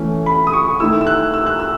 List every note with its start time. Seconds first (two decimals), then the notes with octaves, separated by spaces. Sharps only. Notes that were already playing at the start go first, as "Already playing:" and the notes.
Already playing: E3 A3 C#4
0.26 B5
0.47 D#6
0.53 C#6
0.80 D#3 A3 E4 E6
1.01 E6
1.07 F#6
1.34 E6
1.46 F#6
1.60 E6